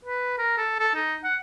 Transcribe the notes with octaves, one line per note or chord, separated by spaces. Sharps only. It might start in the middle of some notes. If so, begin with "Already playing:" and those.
B4
A#4
A4
A4
D#4
F#5